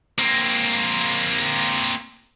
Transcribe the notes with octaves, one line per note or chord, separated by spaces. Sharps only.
A#3 C4